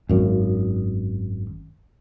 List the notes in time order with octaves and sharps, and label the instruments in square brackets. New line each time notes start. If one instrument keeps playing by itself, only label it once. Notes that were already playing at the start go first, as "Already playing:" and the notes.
[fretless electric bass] G#1 F#2